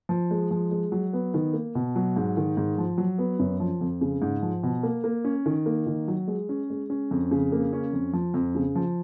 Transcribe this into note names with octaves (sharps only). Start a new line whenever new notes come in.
F3
G#3
F3
G#3
F#3
B3
D#3
A#3
B2
F#3
G#2
D#3
G#2
F3
F#3
B3
F#2
F3
F2
C#3
G#2
F3
B2
A#3
A#3
C#4
D#3
A#3
D#3
F#3
G#3
C#4
G#3
C#4
F2
C#3
A#3
C#4
F2
F3
F2
C#3
F3